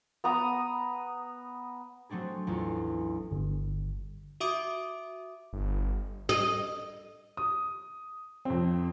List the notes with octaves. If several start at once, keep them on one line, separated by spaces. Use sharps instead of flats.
B3 A#5 D#6
F#3 A3 C4 D4 G#4
A1 E2 F4
G1
F#4 E5 D6 D#6 D7
G1
D#5
D#6
F2 C4